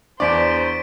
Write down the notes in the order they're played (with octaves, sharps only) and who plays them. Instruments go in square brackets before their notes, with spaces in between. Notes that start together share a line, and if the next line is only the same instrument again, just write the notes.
[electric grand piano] E2 D4 [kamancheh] C5 [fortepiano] D5 [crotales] C#6 B6 D7